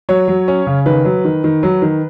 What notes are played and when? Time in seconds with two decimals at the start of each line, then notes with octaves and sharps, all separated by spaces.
0.09 F#3 C#5
0.28 F#3
0.48 C#4
0.67 C#3
0.86 D#3 B4
1.05 F#3
1.25 D#3
1.44 D#3
1.63 F#3
1.82 D#3